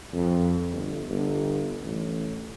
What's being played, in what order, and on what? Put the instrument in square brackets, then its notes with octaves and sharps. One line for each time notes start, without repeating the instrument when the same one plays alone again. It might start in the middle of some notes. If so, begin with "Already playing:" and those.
[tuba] F2
G1
G1
A1